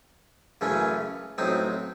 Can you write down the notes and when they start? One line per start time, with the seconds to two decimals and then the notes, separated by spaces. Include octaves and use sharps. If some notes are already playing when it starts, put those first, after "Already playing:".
0.61 F#2 C#3 E3 A3 C#4
1.38 A1 A2 F#3 C4 D#4